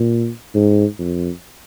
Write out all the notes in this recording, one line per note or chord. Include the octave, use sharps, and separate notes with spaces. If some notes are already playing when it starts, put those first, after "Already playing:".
Already playing: A#2
G#2
F2